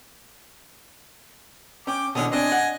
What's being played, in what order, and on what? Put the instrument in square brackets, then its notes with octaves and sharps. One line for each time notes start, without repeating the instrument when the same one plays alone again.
[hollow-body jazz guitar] C#4 [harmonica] G5 D6
[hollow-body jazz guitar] B2 D3 E3 [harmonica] C#4 D#6
[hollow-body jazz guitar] C4 D4 [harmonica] D#5 G#5
[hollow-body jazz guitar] F#5